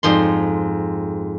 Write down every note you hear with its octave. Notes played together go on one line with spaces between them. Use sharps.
F2 G#2 C6